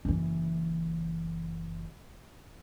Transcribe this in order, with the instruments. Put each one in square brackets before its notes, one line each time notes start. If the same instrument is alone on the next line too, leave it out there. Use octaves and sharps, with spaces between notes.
[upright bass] F#1 E3